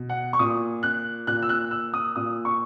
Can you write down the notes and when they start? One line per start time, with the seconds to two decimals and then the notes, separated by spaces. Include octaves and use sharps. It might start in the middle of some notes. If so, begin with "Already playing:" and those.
Already playing: B2
0.09 F#5
0.33 C#6
0.39 A#2 D#6
0.83 F#6
1.27 A#2 F#6
1.42 E6
1.49 F#6
1.71 E6
1.94 D#6
2.16 A#2 D#6
2.45 C#6